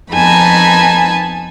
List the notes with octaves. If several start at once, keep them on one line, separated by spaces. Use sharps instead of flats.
F2 B3 D#4 G#5 A5 B5